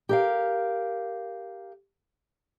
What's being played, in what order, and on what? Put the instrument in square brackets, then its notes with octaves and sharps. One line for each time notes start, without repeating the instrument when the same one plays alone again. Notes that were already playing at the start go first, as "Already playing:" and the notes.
[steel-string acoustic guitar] G4 A#4 F5